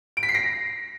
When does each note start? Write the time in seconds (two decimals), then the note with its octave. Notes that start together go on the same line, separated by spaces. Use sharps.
0.17 D7
0.23 B6
0.29 C7
0.35 A#6